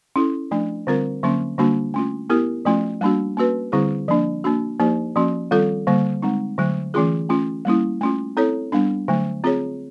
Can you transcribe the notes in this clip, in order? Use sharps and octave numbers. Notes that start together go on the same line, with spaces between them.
C#4 E4 A4
F3 A3 D4
D3 G3 C4 F4 A#4
D3 F#3 A#3 C#4
D3 G3 A#3 D4 F#4
A3 C#4 F4
B3 E4 G4 A#4
F3 A3 C#4 F4
G3 A#3 D4 F#4
A#3 C#4 F#4 B4
D3 G3 C4 E4 G#4
F3 A#3 D4
A#3 D4 F#4
F3 A#3 D#4 G4 C5
F3 A#3 C#4 F#4
D#3 G3 C4 F4 A4
D3 G3 A#3
G#3 C4 D#4
D3 F#3 A3
E3 A3 C#4 F4 G#4
A3 C#4 F4
G3 A#3 C#4 E4
A3 C#4 F4
C4 E4 A4 C#5
G3 B3 D4
D3 F#3 A3
C4 F4 G#4 C#5